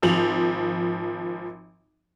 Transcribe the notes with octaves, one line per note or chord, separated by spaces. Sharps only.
G#1 F3 F7 F#7